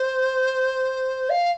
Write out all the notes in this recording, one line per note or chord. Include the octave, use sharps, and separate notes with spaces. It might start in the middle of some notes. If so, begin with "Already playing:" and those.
Already playing: C5
F5